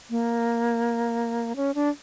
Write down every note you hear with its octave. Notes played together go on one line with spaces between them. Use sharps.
A#3
C#4
D4